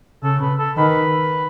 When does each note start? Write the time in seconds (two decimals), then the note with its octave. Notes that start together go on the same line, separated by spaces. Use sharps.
0.23 C#3 A4
0.41 B4
0.59 A4
0.77 D#3 B4